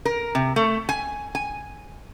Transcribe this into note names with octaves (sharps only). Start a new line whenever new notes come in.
A#4
C3
A3
G#5
G#5